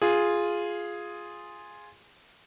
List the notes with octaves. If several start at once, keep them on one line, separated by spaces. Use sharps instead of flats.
F4 G#4